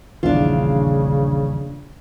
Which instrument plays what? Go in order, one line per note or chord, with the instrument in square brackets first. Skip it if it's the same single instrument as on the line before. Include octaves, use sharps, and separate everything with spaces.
[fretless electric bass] D#1 A#1 E2 [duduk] C#3 [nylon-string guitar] D4 F4